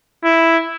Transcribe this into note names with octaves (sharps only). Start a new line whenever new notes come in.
E4